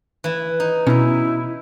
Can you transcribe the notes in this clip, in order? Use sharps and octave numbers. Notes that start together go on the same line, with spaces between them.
E3 E4
D#4
B2 C#4 E4 A#5